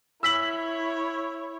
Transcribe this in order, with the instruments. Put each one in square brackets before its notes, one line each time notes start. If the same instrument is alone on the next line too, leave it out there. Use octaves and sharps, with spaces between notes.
[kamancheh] E4 C#5 [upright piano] E6 B6 F#7